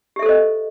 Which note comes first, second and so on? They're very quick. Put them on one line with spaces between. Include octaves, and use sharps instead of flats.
G4 E5 A4 C5 D#5